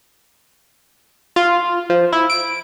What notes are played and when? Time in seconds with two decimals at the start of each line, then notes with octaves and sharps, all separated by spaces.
1.36 F4
1.90 F3
2.13 E4
2.30 D7